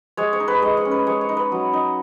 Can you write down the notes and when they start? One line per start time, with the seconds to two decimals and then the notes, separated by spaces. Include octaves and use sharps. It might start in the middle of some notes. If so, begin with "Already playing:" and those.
0.17 G#3 C#5
0.33 C#5
0.40 D#4
0.48 B4
0.62 G#3 D#5
0.77 C#5
0.85 C#4
0.91 B4
1.07 G#3 C#5
1.21 C#5
1.29 D#4
1.37 B4
1.52 F#3
1.73 D#4